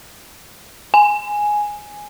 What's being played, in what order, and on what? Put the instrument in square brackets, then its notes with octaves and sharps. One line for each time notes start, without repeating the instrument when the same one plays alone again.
[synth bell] G#5